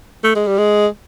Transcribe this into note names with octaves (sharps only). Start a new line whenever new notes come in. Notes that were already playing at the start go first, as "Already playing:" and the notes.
A3
G#3
G3
G#3